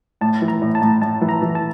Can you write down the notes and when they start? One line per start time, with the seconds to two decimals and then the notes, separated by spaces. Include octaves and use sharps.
0.21 A2 A5
0.42 E3
0.48 A#5
0.62 A2
0.75 A5
0.81 A2
1.02 A2 A5
1.21 E3
1.29 A#5
1.42 E3
1.55 A5